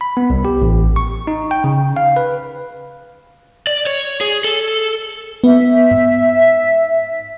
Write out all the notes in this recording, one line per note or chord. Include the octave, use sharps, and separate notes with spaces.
B5
B3
C2
G4
A1
C#6
D#4
G5
C#3
F5
B4
D5
C#5
G#4
A4
B3 E5
G#2